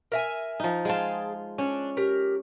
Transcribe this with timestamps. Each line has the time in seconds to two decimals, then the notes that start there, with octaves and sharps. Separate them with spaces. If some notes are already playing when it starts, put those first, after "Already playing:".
0.12 A#4 E5 G#5
0.60 F3 D#4
0.85 G#3 F4 G#4 G5 A5
1.58 C#4 D4
1.97 G4 A#4